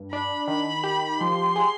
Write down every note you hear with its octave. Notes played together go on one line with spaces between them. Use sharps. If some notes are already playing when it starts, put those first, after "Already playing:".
Already playing: G2
D4 B5
D#3 B5
G4
F3 C6
G#4